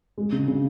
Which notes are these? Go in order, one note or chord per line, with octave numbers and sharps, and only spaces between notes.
G#3
C#3
C#3